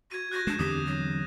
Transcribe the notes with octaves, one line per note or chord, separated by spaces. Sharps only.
F#4 G#6 D#7
F#4 F#6 G6 A#6
G#3 D4 E7
E2 D3 C4 G4 D#6
F#3